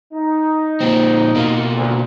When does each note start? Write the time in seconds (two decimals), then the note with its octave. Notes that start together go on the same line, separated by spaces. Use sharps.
0.13 D#4
0.80 A#2 C4
1.35 B2 A#3
1.75 D2